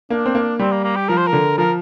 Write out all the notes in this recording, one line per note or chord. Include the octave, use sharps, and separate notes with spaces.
A#3 D4
C4
A#3
G3 C4
A#3
A#3
G4
F3 A#4
C5
A#4
D3
F3 A#4